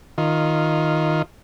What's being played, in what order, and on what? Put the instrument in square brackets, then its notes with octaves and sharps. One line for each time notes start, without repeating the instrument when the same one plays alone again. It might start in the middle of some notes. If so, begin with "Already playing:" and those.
[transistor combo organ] D#3 F4